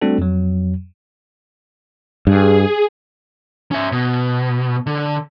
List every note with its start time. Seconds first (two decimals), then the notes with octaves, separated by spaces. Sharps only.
0.02 G3 A3 C4 D4 F#4 A4
0.18 F2 F#3
2.27 G2 G#4
3.72 C#4 E5
3.92 B2
4.87 D3